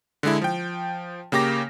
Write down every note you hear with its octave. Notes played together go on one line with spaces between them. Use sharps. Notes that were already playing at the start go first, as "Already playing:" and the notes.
D3 G#3 E4
F3 G5
C#3 A#3 G4 D6 A#6